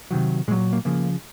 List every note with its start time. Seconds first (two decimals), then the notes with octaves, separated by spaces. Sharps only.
0.11 C3 D#3 F#3
0.48 A#2 G#3
0.51 F#3
0.73 A#3
0.85 C#3 F3 A#3